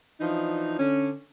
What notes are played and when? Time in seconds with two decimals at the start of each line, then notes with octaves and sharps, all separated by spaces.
0.21 E3 F3 D4 D#4
0.79 D3 C#4